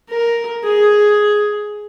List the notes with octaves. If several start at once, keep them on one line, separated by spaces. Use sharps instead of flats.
A#4
G#4